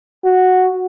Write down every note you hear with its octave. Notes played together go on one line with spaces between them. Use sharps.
F#4